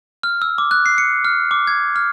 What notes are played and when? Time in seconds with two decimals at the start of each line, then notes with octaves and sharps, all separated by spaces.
0.23 F6
0.42 E6
0.58 D6
0.71 F#6
0.86 C7
0.98 C#7
1.25 F6
1.51 D6
1.67 G#6
1.96 F6